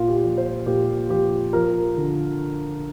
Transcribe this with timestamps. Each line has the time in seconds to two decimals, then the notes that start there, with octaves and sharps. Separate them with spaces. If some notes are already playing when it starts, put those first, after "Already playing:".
Already playing: A#2 F4
0.08 G4
0.23 F3
0.38 C5
0.66 A#2 G4
1.09 F3 G4
1.53 F3 A#4
1.97 D3